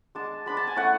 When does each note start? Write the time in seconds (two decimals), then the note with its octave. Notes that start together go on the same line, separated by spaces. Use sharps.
0.15 G#3 D4 A5
0.46 G#3 D4 B5
0.57 A5
0.67 G#5
0.76 A3 C#4 E4 F#5